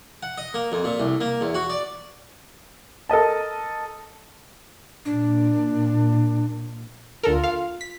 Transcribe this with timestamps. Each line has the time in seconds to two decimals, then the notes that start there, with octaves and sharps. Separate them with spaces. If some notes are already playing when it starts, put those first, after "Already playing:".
0.23 F#5
0.38 D#5
0.54 A#3
0.72 F2
0.84 A#2
1.00 C2
1.21 A#3
1.41 E2
1.55 F#4
1.70 D5
3.09 A4 A#4 D#5 A5
5.05 A#2 D4
7.23 D2 F4 A4 A#4
7.43 F5
7.81 B6